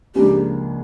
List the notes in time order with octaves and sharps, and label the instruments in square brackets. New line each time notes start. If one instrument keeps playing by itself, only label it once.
[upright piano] C#2 C#3 F3 A#3 D4 [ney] G4